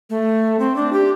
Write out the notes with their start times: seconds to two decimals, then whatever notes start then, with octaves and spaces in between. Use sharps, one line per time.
0.10 A3
0.59 C4
0.76 D4
0.93 G4